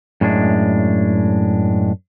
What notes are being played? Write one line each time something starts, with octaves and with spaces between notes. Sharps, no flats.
F#2 A2 G#3 D4